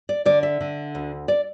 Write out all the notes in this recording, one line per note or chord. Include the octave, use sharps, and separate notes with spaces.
D5
D3 D5
E5
D3
D2
D5